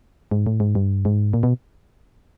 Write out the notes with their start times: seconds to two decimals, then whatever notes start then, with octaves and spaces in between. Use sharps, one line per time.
0.31 G#2
0.46 A2
0.60 G#2
0.75 G2
1.05 G#2
1.33 A#2
1.43 B2